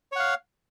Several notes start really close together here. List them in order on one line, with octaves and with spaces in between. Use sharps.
C#5 F#5 F5